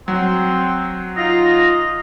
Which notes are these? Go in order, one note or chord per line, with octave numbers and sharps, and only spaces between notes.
F#3 C4
D#4 F4 A#6